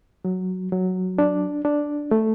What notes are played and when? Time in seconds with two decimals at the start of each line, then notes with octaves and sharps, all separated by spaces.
0.25 F#3
0.72 F#3
1.18 D4
1.65 D4
2.11 A3